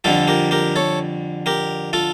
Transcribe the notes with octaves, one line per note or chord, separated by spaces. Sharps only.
F2 D3 G3 F4 A4
G4 A#4
G4 A#4
A4 C#5
G4 A#4
F4 A4